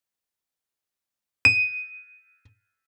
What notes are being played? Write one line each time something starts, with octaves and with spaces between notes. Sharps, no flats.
D#7